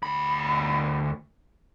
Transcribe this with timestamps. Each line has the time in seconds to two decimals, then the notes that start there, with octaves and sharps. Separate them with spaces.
0.03 D2 B5